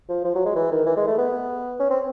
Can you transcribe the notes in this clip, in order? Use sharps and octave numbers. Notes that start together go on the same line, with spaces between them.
F3
F3
F#3
G#3
E3
D#3
E3
G#3
A3
B3
C#4
C4